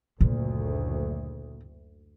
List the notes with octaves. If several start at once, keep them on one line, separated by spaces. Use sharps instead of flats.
F#1 D2 A#2